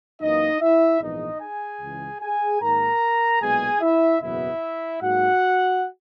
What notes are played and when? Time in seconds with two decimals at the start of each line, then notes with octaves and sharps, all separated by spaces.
0.21 F#2 E3 A#3 D#4 D#5
0.61 E4 E5
1.02 A#1 G#2 E3 B3 D#4 D#5
1.41 G#4 G#5
1.81 C#2 C#3 E3 G#3
2.22 G#4 G#5
2.62 G#2 D#3 A#3 A#4 A#5
3.42 B1 A#2 G#3 B3 G#4 G#5
3.82 E4 E5
4.22 F#1 E2 B2 F#3 B3 E4 E5
5.02 G#2 F#3 A#3 F#4 F#5